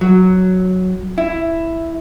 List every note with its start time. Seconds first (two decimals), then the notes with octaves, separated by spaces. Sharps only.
0.01 F#3
1.18 E4